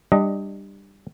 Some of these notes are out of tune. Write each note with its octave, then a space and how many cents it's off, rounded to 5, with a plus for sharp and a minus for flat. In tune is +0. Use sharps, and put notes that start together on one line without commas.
G3 +10 D4 +25 D#5 +15